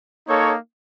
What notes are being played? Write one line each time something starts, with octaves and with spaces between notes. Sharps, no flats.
A#3 D#4 A4 C#5